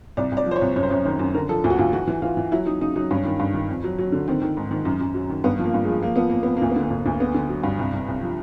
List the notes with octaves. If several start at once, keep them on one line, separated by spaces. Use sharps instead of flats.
C2 D5
C2
D5
F3
C5
C#5
C2
F#2 C#5
C5
F#2 C#5
D#3 C5
F#2
D3 A#4
F3 A4
D2
F#4
D2 F4
E3 F#4
E3
E3 F4
E3
F#3 E4
F#3 D#4
C#3 D#4
F#3 D#4
G2 C#4
D#3
G2
D#3
F2
F#3
F#3
D3
D#3 C4
D#3
G#2
D#3
F#2
F#2
F#3
D#3
G2 B3
F3
A#3
G2
G#3
F3
F3 A#3
F3 B3
F2 A#3
F2 B3
D2 A#3
B3
D3
A#3
D2
D2
A#3
D3 B3
D3
F#3
G2
C2
C2
C2
F3